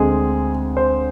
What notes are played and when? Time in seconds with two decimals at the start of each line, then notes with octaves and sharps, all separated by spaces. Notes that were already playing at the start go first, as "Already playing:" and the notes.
Already playing: D2 D3 G#3 C4 G#4
0.77 C5